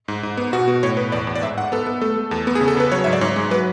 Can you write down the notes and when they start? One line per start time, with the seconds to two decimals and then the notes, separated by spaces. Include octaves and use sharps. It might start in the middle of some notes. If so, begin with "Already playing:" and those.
0.08 G#2
0.23 G#2
0.37 B3
0.53 B2 F#4
0.68 B2
0.83 A2 C#5
0.97 B3 B4
1.12 E2 D5
1.27 E2
1.35 D5
1.42 G#2 E5
1.57 G#2 F#5
1.72 B3 A4
1.87 B3
2.01 A3 A4
2.17 A3
2.31 E2 A4
2.47 B3
2.55 G#4
2.61 C#3
2.68 A4
2.77 C#3 B4
2.92 F#3 C#5
3.04 G#2 E5
3.13 D5
3.21 G#2 C#5
3.36 G#3
3.50 F#3 B4